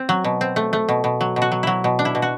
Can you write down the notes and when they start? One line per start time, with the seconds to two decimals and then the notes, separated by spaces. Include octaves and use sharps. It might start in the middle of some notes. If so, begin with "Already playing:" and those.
Already playing: C4
0.09 F#3
0.24 B2
0.41 C4
0.56 A3
0.73 A3
0.89 B2
1.04 B2
1.21 F#3
1.36 B2
1.42 F#4
1.52 F#3
1.63 F#3 E4
1.84 B2
1.99 D4
2.05 E4
2.15 B2
2.22 F#4